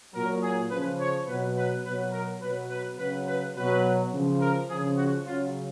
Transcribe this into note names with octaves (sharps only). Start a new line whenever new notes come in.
A#2 F#3 A#4
G#4
C#3 B4
F3
C#5
B2 F#3 B4
B4
B2 F#3 B4
A#4
B2 F#3 B4
B4
C#3 F#3 B4
B4
B2 F#3 B4
C#3 F3
A#4
C#3 F3 G#4
F#4
C#3 F#3 F4